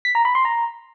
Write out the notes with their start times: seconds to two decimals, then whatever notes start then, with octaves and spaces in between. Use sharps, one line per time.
0.05 B6
0.15 A#5
0.25 B5
0.35 C6
0.45 A#5